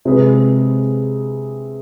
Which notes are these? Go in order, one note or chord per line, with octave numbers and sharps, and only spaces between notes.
C3 G#3 C4 G#4 B4